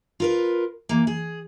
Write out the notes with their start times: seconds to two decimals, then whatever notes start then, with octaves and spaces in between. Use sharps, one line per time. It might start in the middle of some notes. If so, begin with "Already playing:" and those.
0.20 F4 A#4 B4
0.89 E3 A#3
1.07 G#4